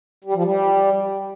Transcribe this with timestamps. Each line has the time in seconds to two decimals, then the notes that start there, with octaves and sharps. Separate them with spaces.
0.24 G3
0.34 F3
0.44 G3